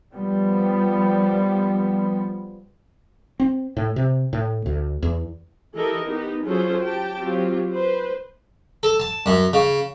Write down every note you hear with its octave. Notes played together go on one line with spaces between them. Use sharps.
F3 G3 B3
C4
A2
C3
A2
D2
E2
E3 G4 A4 A#4 D#5
B3 D#4 G4
F#3 C#4 F4 G#4 A4 C5
G4 G5 A5
F#3 C4 F4 G4
B4 C5
A4
A5
F#2
C#3